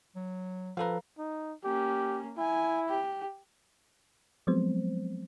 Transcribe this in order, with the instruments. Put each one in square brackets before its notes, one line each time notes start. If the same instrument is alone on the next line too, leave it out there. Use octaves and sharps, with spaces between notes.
[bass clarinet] F#3
[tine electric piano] F3 A4 B4 [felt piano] F5 A#5
[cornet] D#4
[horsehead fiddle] A#3 C#4 [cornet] G4
[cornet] E4 [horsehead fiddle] G#5
[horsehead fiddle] G4
[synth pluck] F3 F#3 G#3 B3 C4 C5